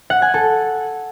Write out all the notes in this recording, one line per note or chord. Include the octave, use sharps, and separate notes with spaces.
F#5
G#5
A4